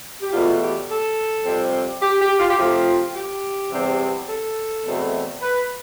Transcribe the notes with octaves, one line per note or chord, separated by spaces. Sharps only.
G4
E2 B2 A3 F4
G4
A4
F2 C3 G3 C4
G4
G4
F4
G4
C3 F3 A3 C4 F4
G4
E2 C3 G3 C4
A4
E2 B2 A3 C4
B4